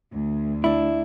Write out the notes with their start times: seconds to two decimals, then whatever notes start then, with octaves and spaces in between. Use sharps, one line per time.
0.10 D2
0.64 D4 E4